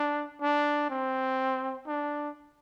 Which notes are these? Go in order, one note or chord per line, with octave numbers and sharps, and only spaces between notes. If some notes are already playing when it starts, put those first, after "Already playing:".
Already playing: D4
D4
C4
D4